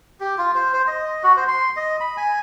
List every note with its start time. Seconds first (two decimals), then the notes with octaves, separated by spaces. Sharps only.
0.20 G4
0.38 F4
0.55 C5
0.73 C5
0.87 D#5
1.23 F#4
1.37 C5
1.48 C6
1.76 D#5
2.00 B5
2.17 G#5